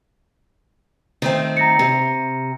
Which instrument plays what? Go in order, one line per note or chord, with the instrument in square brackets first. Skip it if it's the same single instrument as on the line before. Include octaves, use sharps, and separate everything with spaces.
[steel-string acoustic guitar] D#3 A3 C4
[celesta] A#5 A#6 C#7
[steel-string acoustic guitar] C3